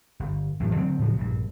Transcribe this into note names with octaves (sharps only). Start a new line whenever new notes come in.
G1
A1 F#2 A2
D3 F#3 C4
A2 C#3 F3 F#3
A#1 G2